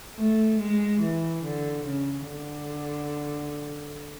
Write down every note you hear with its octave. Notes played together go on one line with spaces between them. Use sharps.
A3
G#3
E3
D3
C#3
D3